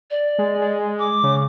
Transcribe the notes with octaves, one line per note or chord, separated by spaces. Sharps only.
D5
G#3
G#3
D6
C#3